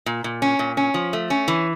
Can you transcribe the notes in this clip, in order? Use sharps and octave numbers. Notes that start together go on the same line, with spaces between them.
A#2
A#2
C#4
A#2
C#4
F3
A3
C#4
E3